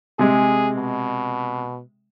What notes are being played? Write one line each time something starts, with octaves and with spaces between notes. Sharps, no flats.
C3 G#3 G#4
B2